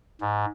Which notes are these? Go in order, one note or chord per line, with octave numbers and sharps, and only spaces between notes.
G#2